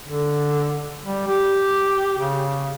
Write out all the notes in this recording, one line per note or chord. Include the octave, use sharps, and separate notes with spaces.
D3
G3
G4
C#3